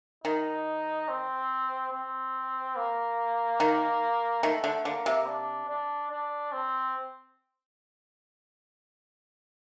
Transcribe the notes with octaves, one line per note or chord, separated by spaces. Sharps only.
D#3 D#4
C4
C4
A#3
D#3
D#3 A3
D3
D3 A#3
C3
D4
D4
D4
C4